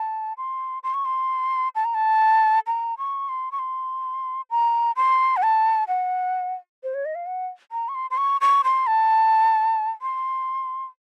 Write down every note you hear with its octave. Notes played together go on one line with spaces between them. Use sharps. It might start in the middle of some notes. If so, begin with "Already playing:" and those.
Already playing: A5
C6
C6
C#6
C6
A5
A#5
A5
A#5
C#6
C6
C#6
C6
A#5
C6
F#5
A5
F#5
C5
C#5
D#5
F5
F#5
A#5
C#6
C6
C6
C#6
C#6
C6
A5
C6